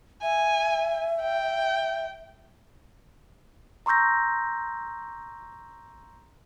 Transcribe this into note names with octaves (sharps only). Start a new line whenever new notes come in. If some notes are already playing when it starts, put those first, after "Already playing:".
E5 G#5
G5
A#5 C6 C#6 E6 G6 A#6